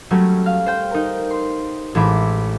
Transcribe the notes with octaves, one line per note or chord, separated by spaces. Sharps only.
F#3 G3 A3 C#4
F5
C5 G5
D#4 A#4
C6
A1 E3 G#3 B5 D6